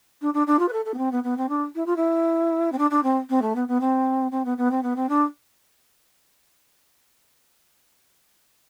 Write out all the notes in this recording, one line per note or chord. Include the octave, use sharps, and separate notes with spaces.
D4
D4
D4
F4
B4
A4
A4
B3
C4
B3
B3
C4
D4
E4
F4
E4
C4
D4
D4
C4
C4
A3
B3
B3
C4
C4
B3
B3
C4
B3
C4
D4